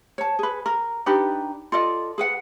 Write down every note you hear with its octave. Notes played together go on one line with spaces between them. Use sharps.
C#5 A5
G#4 B4
A#4
D4 D#4 G4 B4
F4 A4 D5 D#5
G#4 B4 F#5